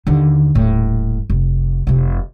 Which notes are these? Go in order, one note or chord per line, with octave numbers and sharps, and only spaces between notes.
D#2 D3
D#1 A2
F1
F1 C3